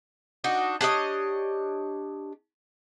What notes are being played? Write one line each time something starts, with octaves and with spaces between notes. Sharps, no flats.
D4 D#4 F#4
D4 G4 C#5 D#5